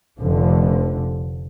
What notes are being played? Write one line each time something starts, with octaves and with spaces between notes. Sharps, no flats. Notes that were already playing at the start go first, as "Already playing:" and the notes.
F1 D3 F3